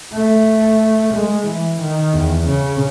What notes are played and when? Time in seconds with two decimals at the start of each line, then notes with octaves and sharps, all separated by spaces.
0.14 A3
1.14 G#3
1.47 E3
1.81 D#3
2.14 E2
2.48 C#3